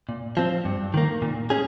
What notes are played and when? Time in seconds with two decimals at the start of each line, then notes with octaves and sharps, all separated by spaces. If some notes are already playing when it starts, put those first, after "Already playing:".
0.09 A#2
0.37 F3 C4
0.65 G2
0.94 D#3 A#3
1.22 A#2
1.50 C#4 G#4